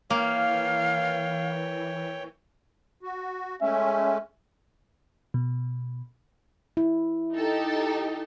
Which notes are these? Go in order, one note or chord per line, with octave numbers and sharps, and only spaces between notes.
E3 A#3 C#5 F5 G5
F#4
G#3 A3 C#4 E5
B2
E4
D#4 G4 A4